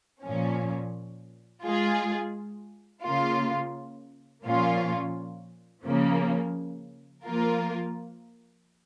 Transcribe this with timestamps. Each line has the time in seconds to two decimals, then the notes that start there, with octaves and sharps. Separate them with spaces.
0.23 A#2 F3 C#4
1.64 G#3 F4 G#4
3.03 C#3 A#3 F4
4.45 A#2 F3 A#3 C#4 F4
5.85 C#3 F3 A#3
7.25 F3 A#3 F4 A#4